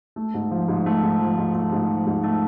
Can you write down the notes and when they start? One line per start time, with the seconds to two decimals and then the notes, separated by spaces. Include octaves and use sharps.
0.16 A3
0.34 G#2
0.51 F3
0.68 G#2
0.86 A3
1.03 G#2
1.20 F3
1.38 G#2
1.54 A3
1.72 G#2
1.89 F3
2.06 G#2
2.24 A3